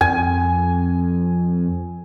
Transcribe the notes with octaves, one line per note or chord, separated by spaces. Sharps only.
F2 G#5